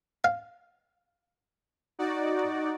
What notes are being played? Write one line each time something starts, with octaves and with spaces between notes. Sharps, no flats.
F5
D#4 F#4 D5